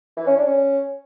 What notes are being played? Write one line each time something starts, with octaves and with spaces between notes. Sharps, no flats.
E3
C#4
D4
C#4